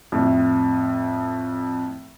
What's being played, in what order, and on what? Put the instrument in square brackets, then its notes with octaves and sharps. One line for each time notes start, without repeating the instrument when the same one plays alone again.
[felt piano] F2 A2